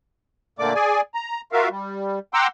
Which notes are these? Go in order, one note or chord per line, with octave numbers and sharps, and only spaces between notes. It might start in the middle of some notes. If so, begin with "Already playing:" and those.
A#2 D3 A3 A#3 D5 D6
G#4 D5 G#5
A#5
F4 F#4 A#4 E5 F5
G3
F#5 G5 A#5 C6 D6 E6